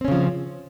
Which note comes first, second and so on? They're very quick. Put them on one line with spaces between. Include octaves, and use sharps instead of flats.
C4 C#4 C#3 F3